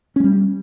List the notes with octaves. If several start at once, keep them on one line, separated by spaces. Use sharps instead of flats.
G3 G#3 C#4